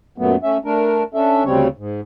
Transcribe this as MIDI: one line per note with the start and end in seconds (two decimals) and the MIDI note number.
0.18 0.36 42
0.18 0.36 46
0.18 0.36 54
0.18 0.36 57
0.18 0.36 59
0.43 0.57 57
0.43 0.57 61
0.43 0.57 76
0.65 1.03 57
0.65 1.03 62
0.65 1.03 70
1.14 1.43 61
1.14 1.43 62
1.14 1.43 69
1.14 1.43 76
1.44 1.68 38
1.44 1.68 49
1.44 1.68 55
1.44 1.68 60
1.44 1.68 73
1.78 2.01 44